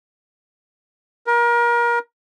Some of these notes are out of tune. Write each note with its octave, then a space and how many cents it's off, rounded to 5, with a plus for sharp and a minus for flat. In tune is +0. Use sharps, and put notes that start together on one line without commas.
A#4 +30